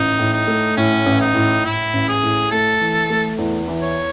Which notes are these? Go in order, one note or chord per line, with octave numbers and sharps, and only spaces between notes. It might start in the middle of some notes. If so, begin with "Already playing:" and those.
Already playing: A1 D#4
A2
D#4
A3
A2 C#4
A1
D#4
A2
A2 E4
A1
G#4
A2
A3 A4
E3
A3
E2
E3
C#5